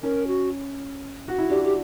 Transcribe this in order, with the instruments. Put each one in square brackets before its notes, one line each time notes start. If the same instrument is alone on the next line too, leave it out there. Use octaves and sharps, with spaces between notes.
[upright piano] C#4 [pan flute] A#4
[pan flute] F#4
[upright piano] F#4
E4
[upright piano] D4 [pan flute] G4
[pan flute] G4